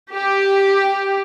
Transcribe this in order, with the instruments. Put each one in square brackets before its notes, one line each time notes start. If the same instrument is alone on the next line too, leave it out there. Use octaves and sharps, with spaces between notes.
[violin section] G4